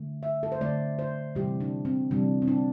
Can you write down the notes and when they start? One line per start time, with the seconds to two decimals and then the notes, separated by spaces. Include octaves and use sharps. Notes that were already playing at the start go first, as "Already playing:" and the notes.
Already playing: D3 A3
0.23 E5
0.43 A4
0.52 C5
0.61 D3 A3 D5
0.99 C5
1.35 C3 E3 G3 G4
1.60 D4
1.85 C4
2.11 C3 E3 G3 D4
2.42 C4
2.48 D4